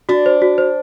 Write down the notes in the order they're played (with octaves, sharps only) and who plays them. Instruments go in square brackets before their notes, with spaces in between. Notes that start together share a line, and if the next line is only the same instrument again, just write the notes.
[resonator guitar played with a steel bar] D4 [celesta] F#4
[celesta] C5
F#4
C5